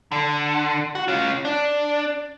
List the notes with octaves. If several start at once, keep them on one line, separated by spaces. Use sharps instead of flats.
D3
F#4
C#4 F4
D4